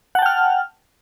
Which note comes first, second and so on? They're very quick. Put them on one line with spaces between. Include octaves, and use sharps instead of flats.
F#5 A5 G5 F6